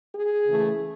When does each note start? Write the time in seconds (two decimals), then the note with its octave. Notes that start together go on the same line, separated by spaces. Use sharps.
0.12 G#4
0.46 C#3 E3 A3